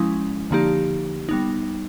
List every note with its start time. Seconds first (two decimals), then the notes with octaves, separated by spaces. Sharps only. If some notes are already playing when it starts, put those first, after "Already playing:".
Already playing: F3 G#3 C#4 E4
0.51 D3 F3 A#3 D#4 G4
1.29 G3 B3 D#4